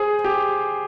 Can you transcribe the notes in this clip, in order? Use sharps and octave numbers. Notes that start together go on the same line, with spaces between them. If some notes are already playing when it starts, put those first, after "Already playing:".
Already playing: G#4 C5
G4